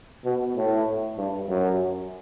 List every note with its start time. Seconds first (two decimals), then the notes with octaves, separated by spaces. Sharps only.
0.25 B2
0.56 A2
1.17 G2
1.49 F#2